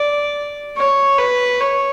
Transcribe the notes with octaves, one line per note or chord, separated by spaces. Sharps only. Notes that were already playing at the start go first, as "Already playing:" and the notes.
Already playing: D5
C#5
B4
C#5